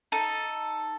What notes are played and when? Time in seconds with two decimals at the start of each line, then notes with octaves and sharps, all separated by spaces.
0.12 D#4 A4